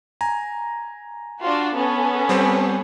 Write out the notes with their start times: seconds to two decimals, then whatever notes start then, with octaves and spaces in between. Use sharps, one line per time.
0.21 G#5 A#5
1.41 D4 F4 F#4
1.75 B3 C#4 A4
2.29 G3 C4 C5